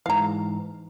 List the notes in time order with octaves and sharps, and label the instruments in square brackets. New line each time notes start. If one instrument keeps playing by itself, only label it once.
[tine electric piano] G#2 E3 [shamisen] F5 A#5